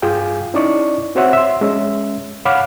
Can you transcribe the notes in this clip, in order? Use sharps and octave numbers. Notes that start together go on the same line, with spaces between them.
G2 F4 G#4 G5 G#5
C#4 D#4 E4 D5 C#6
C4 F#4 C5 C#5 E5 F#5
E5 C6
G#3 C#4 E5
C#5 F5 F#5 B5 D6 F6